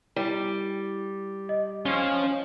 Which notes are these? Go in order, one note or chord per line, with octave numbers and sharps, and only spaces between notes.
G3 E4
D#5
C#4 F4 C5